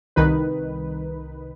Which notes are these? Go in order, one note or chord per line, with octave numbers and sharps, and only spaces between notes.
C2 D#3 D#4 B4